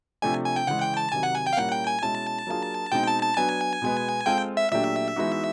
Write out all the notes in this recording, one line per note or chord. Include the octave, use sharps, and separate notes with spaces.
C3 F3 A3 D4 G4 G#5
G#5
G5
C#3 E3 G#3 F#5
G5
A5
C3 D#3 F#3 G#5
F#5
G#5
G5
F5
A#2 G3 A#3 C#4 E4 F#5
G5
G#5
B2 G#3 C#4 E4 A5
F#3 A#3 D4 F4 G#4
B2 G#3 C4 D#4 G5
A5
A5
F#3 B3 D4 G#5
B2 G#3 B3
G#3 C4 F4 A4 G5
E5
A#2 F#3 A3 D4 G4 E5
E3 G#3 B3 D#4 F#4